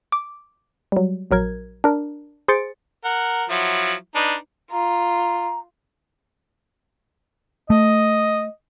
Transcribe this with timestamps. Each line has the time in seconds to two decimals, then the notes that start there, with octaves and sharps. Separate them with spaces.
0.12 D6
0.92 F#3 G3
1.31 A#1 F#3 A#4 G#6
1.84 D4 A#4
2.48 G#4 C5 C6 A6 C#7 D7
3.05 A#4 F#5
3.50 F3 F#3 E4
4.15 D4 D#4 B4
4.71 F4 A#5
7.70 A3 D#5